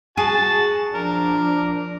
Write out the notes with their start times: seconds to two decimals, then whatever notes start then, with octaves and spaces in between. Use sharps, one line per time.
0.17 F#4 G#4 A5
0.94 F3 D4 A#4